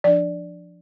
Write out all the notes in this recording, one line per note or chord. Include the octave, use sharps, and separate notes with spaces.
F3 D4 D5